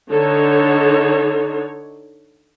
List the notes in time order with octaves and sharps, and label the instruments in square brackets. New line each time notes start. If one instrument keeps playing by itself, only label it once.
[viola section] D3 D#4 A4 C#5